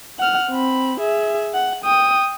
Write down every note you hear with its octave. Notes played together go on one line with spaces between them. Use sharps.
F#5 F6
C4 B5
G#4 E5
F#5
G5 D#6